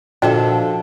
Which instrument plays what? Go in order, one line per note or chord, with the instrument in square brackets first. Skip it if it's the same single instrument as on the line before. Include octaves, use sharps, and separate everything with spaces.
[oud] A#2 D3 A4 [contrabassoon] F3 [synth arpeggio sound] D4 [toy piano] F#4 D#5 G5